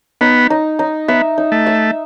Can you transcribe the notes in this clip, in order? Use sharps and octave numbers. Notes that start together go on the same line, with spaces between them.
B3 D#4
D#4
D#4
B3 E5
D#4
A3
E5